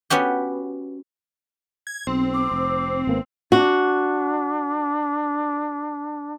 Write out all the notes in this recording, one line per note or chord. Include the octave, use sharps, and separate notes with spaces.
B3 C#4 F#4 G4
G#6
B1 C4
D6
F1
G#1 A#3 B3
D4 F#4